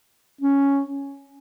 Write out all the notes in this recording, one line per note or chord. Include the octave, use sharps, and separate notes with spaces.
C#4